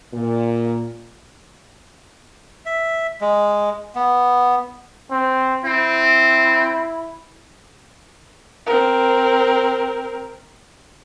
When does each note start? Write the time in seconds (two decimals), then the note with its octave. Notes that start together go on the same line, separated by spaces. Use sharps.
0.13 A#2
2.66 E5
3.21 G#3
3.95 B3
5.11 C4
5.64 C4 E4
8.66 C4 A#4